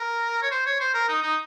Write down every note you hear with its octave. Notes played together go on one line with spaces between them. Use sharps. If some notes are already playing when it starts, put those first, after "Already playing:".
Already playing: A#4
C#5
C5
C#5
C5
A#4
D#4
D#4